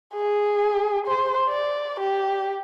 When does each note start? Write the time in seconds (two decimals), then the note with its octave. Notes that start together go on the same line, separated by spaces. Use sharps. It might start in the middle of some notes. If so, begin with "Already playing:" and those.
0.14 G#4
1.06 C5
1.49 D5
2.00 G4